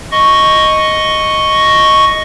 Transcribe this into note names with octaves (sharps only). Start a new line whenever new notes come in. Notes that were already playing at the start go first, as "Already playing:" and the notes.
D#5 C#6